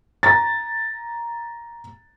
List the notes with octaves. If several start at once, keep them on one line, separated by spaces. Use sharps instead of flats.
A#5 A6